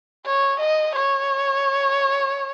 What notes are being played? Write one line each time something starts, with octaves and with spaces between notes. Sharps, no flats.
C#5
D#5
C#5